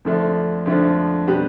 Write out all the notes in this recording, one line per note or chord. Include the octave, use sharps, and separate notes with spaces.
F2 D3 F3 A3 D4
F2 D3 F3 A3 D4
B2 G3 D4 G4 B4